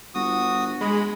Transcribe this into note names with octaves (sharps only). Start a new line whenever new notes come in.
G1 F#4 D#6
G#3 B5